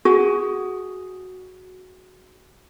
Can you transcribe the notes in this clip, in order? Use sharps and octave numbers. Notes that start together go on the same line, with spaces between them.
F#4 G#4